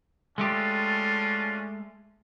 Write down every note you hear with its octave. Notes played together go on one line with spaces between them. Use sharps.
G#3 A3 C#4 D4 F4 G4